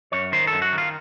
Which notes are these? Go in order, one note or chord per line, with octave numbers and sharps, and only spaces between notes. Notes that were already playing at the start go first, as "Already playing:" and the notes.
F#2 C#5
D#3 C5
A4
F#2
F#4
D#3
F4